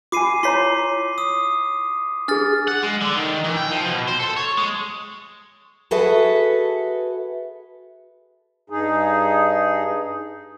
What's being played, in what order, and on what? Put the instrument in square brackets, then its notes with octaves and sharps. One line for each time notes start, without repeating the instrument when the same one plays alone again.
[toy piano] F4 G#5 [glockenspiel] D6 C7 D#7
[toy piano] E4 C#5 A#5 [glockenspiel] C6 B6 C7
[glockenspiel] D#6
[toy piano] D4 G#4 [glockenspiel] F6 A6
[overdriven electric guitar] F#5
G#3
D3
D#3
E3
G5
F3
B2
C5
A4
C#5
G#3
[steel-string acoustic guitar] F#4 G#4 A4 B4 E5 F#5
[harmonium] G2 D#4 G#4